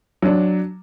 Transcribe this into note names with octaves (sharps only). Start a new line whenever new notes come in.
F#3 D4